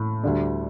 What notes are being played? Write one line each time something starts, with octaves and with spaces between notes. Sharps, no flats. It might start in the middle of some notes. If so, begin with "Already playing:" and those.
Already playing: A2
D2 D3 G3 D4 D5